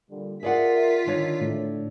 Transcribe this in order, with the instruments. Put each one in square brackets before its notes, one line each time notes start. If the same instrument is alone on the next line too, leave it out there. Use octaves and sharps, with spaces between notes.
[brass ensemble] A#2 D3 G3
[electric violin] F4 B6 [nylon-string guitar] G#4 D5 F#5 [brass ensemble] A#4 E5
[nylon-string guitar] D3 D4 C#5 [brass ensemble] D#3
[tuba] A2